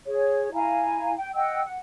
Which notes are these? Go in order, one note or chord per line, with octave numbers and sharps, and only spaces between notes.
G#4 C#5
E4 F5 G#5 A#5
G5
D#5 F#5 G5 E6
F#5